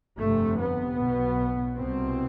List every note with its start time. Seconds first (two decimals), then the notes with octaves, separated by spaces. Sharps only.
0.18 G1 F2 C3 A3
0.58 B3
0.98 B1 B2
1.78 C2 B2 C4